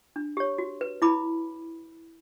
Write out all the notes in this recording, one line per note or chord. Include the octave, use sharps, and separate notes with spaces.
D4
G4 C#5
F#4
B4
E4 B5 D6